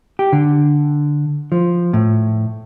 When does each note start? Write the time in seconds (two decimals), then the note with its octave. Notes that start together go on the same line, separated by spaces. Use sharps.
0.19 G4
0.33 D3
1.52 F3
1.93 A2